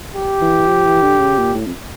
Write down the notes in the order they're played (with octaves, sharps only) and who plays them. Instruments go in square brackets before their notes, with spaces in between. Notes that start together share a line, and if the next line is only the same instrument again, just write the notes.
[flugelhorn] G4
[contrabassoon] E3
F3
E3
D3
C#3
A#2
A2
F2